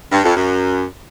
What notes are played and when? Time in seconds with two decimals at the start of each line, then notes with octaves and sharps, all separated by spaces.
0.12 G2
0.24 F2
0.36 F#2